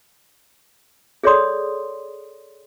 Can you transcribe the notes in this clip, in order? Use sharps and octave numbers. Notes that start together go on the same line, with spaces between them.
G#4 A4 C#5 D5 C6 D#6